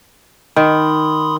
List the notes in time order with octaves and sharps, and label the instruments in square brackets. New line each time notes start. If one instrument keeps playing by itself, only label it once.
[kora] D#3 [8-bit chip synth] B5 C6 D#6